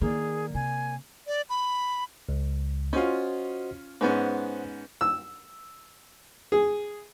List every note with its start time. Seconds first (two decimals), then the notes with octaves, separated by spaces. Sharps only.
0.01 D#3 A#3 G#4 D5
0.55 C3 G#5
1.27 D5
1.49 B5
2.29 C#2
2.93 C#4 F4 F#4 C5 D#5
4.01 G#2 B3 C#4 C5 F#5
5.01 E6
6.52 G#4